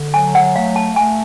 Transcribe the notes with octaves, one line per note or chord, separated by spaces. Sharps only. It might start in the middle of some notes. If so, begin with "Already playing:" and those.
Already playing: D3
F#3 G#5
F#5
A3 F5
A5
A3 G#5